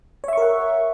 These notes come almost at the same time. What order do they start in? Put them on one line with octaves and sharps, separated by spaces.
C#5 E5 C#6 A#4 F#5